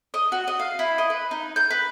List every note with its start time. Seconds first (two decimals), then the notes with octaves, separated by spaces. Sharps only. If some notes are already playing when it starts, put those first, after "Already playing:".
0.14 D#5
0.32 F#4
0.48 D#5
0.59 F5
0.79 E4
0.98 D#5
1.10 B4
1.31 D#4
1.56 G6
1.70 B4